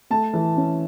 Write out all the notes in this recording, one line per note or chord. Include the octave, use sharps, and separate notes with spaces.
A3 A5
E3
C#4